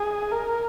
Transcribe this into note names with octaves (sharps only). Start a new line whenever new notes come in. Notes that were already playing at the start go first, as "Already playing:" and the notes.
Already playing: G#4
A#4